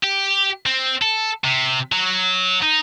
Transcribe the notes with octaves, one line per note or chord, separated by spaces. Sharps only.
G4
C4
A4
C3
F#3
D#4